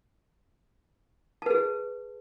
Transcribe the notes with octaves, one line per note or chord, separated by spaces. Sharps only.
G#4 B4 A5